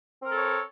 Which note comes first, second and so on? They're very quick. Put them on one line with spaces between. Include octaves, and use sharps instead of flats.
C4 A#4 A4 C#5